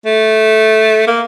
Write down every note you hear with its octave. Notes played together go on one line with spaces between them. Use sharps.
A3
A#3